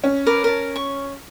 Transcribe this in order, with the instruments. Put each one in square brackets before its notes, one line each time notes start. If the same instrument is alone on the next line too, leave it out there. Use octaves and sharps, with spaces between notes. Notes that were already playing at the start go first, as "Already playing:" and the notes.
[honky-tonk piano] C#4
[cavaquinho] A#4 B4 D5
A#4 A5
C#6